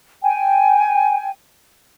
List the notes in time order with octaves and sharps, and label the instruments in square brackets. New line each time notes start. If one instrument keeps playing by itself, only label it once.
[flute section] G5 G#5